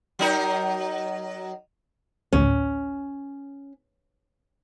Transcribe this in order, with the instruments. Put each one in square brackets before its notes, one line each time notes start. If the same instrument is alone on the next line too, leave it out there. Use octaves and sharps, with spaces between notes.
[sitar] F#3 D#4 A#4
[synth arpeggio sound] A1 D2 A2 [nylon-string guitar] C#4